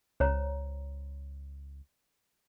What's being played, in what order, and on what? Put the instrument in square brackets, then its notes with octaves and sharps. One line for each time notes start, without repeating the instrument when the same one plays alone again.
[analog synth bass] C#2 [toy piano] C5 C#5 A#5